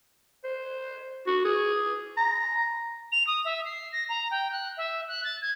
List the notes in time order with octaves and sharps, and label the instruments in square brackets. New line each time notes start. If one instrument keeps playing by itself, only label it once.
[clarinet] C5
F#4
G#4
A#5
[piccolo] F7
D#6
E5
C7
A#6
A#5
G5
F#6
E5
F#6
A6
G#6